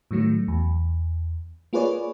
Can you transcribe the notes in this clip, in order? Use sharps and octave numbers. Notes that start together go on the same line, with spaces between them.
A2 D#3 F#3 A3
E2
A#3 F4 G#4 B4 C#5 D5